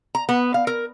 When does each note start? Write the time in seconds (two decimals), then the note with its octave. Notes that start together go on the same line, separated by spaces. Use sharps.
0.15 A#5
0.29 B3
0.54 F5
0.67 A#4